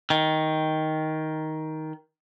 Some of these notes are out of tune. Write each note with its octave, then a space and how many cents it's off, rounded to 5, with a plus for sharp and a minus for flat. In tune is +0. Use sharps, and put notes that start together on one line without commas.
D#3 +10